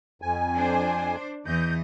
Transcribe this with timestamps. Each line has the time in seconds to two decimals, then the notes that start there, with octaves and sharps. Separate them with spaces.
0.22 F2 G#5
0.56 D4 C5
1.46 E2 E3 D#5 G6